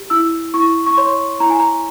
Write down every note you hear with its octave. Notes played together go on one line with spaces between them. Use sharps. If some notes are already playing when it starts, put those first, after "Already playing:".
Already playing: G4
E4 E6
E4 C#6
C#6
C#5 C6
E4 A#5
G#5
A#5